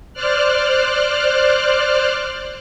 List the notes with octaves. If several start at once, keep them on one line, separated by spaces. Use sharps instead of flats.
C5 D5 F6 F#6